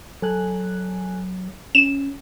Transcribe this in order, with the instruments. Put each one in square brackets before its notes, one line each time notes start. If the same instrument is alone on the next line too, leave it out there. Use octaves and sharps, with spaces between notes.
[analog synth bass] F#3 [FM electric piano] A4 G#5 F#6
[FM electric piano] C#4 [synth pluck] E7